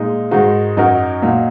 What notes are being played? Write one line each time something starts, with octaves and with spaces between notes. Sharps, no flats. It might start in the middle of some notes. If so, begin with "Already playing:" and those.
Already playing: A#2 G#3 D#4
G#2 D#3 G#3 D#4 F#4
F#2 F#3 D#4 F#4 A#4
A#2 F#3 D#4